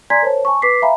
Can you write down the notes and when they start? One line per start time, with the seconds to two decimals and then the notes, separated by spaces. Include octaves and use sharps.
0.10 D5 G#5 A#5 C6 G#6 B6
0.22 A#4 C5 C#5 A5
0.45 G#5 A5 C#6
0.62 B4 D6 B6 C7
0.82 E5 F5 G#5 A#5 B5